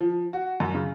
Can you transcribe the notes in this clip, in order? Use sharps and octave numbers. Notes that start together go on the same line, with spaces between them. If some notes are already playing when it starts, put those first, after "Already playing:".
F3
F#4
F#2
C#3